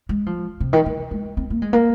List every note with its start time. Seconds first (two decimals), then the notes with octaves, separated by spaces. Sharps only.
0.09 G#3
0.26 F3
0.60 C3
0.73 D#3
0.86 D#3
1.11 G#3
1.37 C4
1.50 A#3
1.62 G#3
1.73 A#3